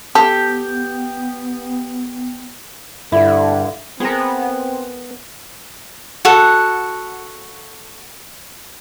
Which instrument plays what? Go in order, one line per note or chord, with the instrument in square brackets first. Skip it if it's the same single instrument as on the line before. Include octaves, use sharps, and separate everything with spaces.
[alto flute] B3 [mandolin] G4 [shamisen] A4
[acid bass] G2 [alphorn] D3 [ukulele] E4
[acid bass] B3 [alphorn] C4 [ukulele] G#4 A#4
[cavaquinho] F#4 A4 F#5